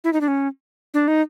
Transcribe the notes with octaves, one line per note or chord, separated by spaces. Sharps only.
E4
D#4
D4
C#4
D4
D#4